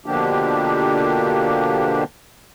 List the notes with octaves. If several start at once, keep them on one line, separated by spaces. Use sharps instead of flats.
B2 D3 F3 A#3 D4 G4